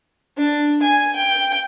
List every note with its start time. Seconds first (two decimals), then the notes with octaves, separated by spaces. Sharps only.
0.37 D4
0.82 G#5
1.15 G5